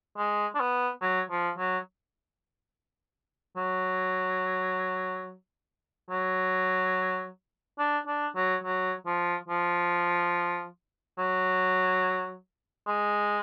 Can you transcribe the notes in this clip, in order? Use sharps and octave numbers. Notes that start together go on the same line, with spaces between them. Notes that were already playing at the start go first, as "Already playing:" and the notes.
G#3
D4
B3
F#3
F3
F#3
F#3
F#3
D4
D4
F#3
F#3
F3
F3
F#3
G#3